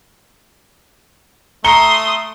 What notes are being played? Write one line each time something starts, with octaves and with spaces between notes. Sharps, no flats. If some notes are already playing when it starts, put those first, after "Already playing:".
A3 A#5 C6 D#6 C#7 G7